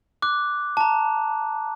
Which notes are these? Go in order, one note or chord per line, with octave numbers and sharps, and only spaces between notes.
D6 F#6
A5 A#5